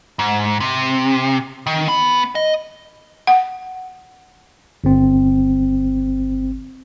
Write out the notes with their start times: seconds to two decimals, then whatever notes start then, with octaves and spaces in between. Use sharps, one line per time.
0.19 G#2
0.60 C3
1.67 D#3
1.89 B3
2.35 D#5
3.27 F#5
4.84 G1 C4